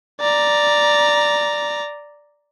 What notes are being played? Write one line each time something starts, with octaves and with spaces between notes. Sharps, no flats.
D5 A#5